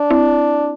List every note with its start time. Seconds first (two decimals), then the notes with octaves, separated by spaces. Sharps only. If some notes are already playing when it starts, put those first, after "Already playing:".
Already playing: D4
0.10 C4 E4